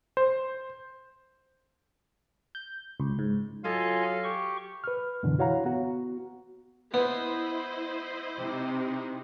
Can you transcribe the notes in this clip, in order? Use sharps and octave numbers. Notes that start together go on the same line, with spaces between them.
C5
G6
C#2
G#2
F#3 F4 A4 D#5 F5 G#5
G4 C#6
B4 F6
F#2 B2 D3 E3
E4 F#4 C#5 F5 F#5 A#5
B3 F#4
B3 E4 B4 C5 D#5
C3 D#4